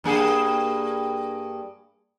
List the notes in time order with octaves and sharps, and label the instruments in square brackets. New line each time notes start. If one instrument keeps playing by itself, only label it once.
[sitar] G2 A#3 G#4